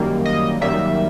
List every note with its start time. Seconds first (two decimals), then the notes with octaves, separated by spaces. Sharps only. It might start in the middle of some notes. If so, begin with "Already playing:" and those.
Already playing: F#2 D#3 G3 A#3
0.26 D#5
0.61 F#2 D#3 G3 A#3 E5